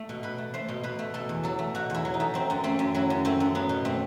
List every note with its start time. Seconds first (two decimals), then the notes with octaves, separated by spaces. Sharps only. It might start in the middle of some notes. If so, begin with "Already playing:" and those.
Already playing: A3
0.09 B2
0.23 B2 B4
0.38 A3
0.54 A3 C5
0.68 B2
0.83 B2 B4
0.99 A3
1.14 B2 A4
1.29 E2
1.43 F#3 A4
1.59 A3
1.75 B2 F#4
1.90 E2 E4
2.05 F#3
2.14 D#4
2.20 A3
2.34 F#3 C4
2.50 F#2
2.64 A3 C4
2.79 F#2
2.94 F#3 E4
3.10 F#2
3.25 A3 C4
3.40 F#2
3.55 F#3 B3
3.69 B2
3.85 A3 C4